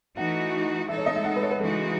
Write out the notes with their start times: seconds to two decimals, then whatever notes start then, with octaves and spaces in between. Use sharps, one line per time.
0.17 E3 A3 D#4 F#4 F#5
0.88 G#3 D#4 A4 E5
0.97 C#5
1.06 D#5
1.16 E5
1.24 F#5
1.36 B4
1.42 C#5
1.51 B4
1.60 C#3 E3 G#3 D#4 F#4 A4